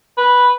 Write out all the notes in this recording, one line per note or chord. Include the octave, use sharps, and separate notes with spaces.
B4